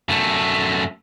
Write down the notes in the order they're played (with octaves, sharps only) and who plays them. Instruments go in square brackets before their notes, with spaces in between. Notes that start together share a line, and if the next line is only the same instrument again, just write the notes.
[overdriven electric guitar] F#2 A3